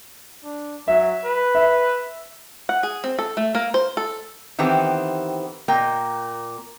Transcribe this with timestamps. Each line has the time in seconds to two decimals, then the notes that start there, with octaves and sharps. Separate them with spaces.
0.45 D4
0.88 F#3 E5
1.24 B4
1.55 E5
2.69 F#5
2.83 G#4
3.04 C4
3.19 A4
3.37 A3
3.55 A#3
3.74 C5
3.97 A4
4.59 D#3 E3 B3 C4 G4 A4
5.68 A#2 A#3 A#4 G5